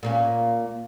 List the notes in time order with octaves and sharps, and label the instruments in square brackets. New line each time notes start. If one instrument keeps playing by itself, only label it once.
[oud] A#2 A#3 C#4